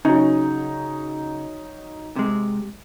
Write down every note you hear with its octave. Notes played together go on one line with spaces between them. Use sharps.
C#3 F#3 D#4
C3 G#3